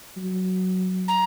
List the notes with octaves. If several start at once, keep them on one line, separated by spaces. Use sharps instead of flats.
F#3
A#5